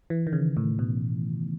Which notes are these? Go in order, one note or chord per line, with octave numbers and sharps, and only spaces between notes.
E3
D#3
C#3
A2
B2